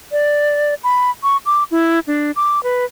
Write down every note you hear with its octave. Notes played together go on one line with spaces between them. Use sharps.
D5
B5
C#6
D6
E4
D4
D6
B4